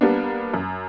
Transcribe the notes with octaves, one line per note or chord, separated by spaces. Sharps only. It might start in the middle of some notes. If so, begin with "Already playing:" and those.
G3 A#3 B3 D4
F#2